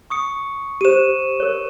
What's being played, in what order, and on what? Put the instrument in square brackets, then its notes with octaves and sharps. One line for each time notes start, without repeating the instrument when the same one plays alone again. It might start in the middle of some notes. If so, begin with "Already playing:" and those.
[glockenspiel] C#6 D#6 C#7
[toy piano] G4 C5 [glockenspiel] D#7 E7
[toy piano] A#4 C#5